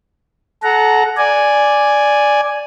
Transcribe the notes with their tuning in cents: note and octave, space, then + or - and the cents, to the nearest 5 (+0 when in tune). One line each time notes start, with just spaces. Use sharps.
A4 -30 F#5 +0 A#5 -5
D5 +0 G#5 +0